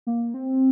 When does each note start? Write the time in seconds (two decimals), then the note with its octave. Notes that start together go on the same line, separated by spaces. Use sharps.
0.07 A#3
0.34 C4